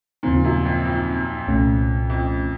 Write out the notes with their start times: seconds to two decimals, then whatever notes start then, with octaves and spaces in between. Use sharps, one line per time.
0.23 D#2 A#2 C#3 F3 C4 D#4
0.44 F#2
0.65 F2
0.85 F2
1.48 C2 A#2 A3 C#4
2.10 F2